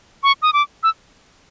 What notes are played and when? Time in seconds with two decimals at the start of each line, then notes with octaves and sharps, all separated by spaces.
0.23 C#6
0.42 D#6
0.53 D6
0.83 E6